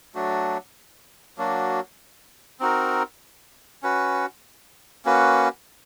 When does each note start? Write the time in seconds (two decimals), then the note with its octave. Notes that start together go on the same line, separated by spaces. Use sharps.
0.15 F#3 A3 D4 F#4
1.38 F#3 A#3 D4 F#4
2.60 C4 D#4 F#4 A#4
3.83 C#4 F#4 B4
5.05 A#3 C#4 F#4 B4